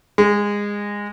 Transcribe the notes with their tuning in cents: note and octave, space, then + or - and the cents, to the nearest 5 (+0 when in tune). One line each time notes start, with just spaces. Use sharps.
G#3 -20